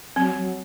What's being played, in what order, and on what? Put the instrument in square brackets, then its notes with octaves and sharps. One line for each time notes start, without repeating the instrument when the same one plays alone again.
[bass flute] F#3 [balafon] C4
[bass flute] F#3